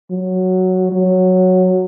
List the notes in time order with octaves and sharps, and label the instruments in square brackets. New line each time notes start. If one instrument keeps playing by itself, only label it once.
[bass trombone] F#3
F#3